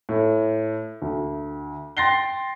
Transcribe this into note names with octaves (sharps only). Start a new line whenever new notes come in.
A2
D2
G5 C6 A6 A#6 C7 G7